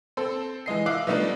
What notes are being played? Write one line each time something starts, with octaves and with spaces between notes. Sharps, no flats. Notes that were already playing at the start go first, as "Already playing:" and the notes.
C4 A4 C5
E3 G#3 D#5 C7
E5 F5 D6 F#6 C7
B2 F3 G3 A3 D4 D#4